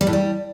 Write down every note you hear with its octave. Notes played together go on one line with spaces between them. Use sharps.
G3
A2
G3